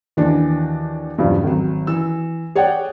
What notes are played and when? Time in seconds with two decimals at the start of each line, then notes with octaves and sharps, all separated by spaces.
0.17 D#2 E3 D4 F#4
1.18 E2 G2 C#3 F3 F#3
1.43 G#1 F#3
1.87 E3 E6
2.55 G#4 C#5 D5 F#5 G5